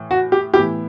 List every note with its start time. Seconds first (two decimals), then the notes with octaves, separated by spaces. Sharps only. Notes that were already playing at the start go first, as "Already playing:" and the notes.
Already playing: A2 E3
0.11 F#4
0.32 G4
0.54 A2 E3 B3 E4 G4